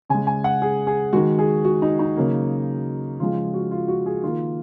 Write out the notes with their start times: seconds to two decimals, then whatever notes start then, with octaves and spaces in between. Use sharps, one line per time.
0.10 C#3 G#3 G#5
0.27 G#5
0.44 F#5
0.62 G#4
0.87 G#4
1.13 D#3 G#3 F#4
1.39 G#4
1.65 F#4
1.82 D#4
1.99 D#4
2.16 C#3 F#3 A#3
3.20 C#3 F3 G#3 F4
3.54 F#4
3.71 F4
3.88 F#4
4.06 G#4
4.23 D#3 A#3 F4